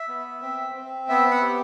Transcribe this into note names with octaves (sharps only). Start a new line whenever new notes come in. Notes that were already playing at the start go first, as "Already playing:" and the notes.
Already playing: E5
B3
C4
C4
B3 E5
F#5
G4